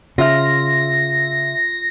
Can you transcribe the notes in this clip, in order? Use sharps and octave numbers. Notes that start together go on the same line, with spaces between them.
C#3 F4 E5 F6 A#6